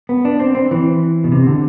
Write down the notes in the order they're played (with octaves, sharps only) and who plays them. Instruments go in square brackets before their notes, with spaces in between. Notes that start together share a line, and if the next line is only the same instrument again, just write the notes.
[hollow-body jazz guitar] B3
D4
C4
C4
E3
B2
C3
D3